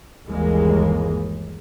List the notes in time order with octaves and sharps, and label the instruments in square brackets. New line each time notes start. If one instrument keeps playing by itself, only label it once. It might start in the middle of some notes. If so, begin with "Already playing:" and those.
[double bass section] G1 D#2 E3 G#3 A#3